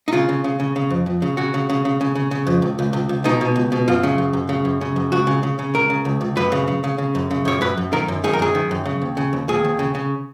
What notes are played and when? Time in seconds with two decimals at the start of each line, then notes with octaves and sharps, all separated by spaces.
0.08 D#4
0.13 C#3 F4
0.29 C#3
0.44 C#3
0.60 C#3
0.76 C#3
0.90 F2
1.06 F2
1.22 C#3
1.37 C#3 F#4
1.54 C#3
1.70 C#3
1.85 C#3
2.01 C#3
2.15 C#3
2.31 C#3
2.47 F2
2.62 C#2
2.79 C#2
2.93 C#2
3.09 C#2
3.24 B2 D#4
3.41 B2
3.56 C#2
3.72 B2
3.88 F#2 F4
4.03 C#3
4.18 F#2
4.33 F#2
4.49 C#3
4.65 F#2
4.81 C#3
4.96 F#2
5.12 C#2 F#4
5.27 C#3
5.43 C#3
5.59 C#3
5.74 C#2 A#4
5.90 C#3
6.05 C#2
6.21 C#2
6.37 F#2 B4
6.52 C#3
6.68 C#3
6.84 C#3
6.98 C#3
7.15 F#2
7.31 C#3
7.45 F#2 C#5
7.61 F#2 B4
7.77 F#2
7.93 D#3 A#4
8.08 F#2
8.24 D#3 G#4
8.33 A#4
8.39 F#2 G#4
8.55 D#3
8.71 F#2
8.85 C#3
9.02 D#2
9.17 C#3
9.33 D#2
9.48 D#2 G#4
9.65 D#2
9.79 C#3
9.95 C#3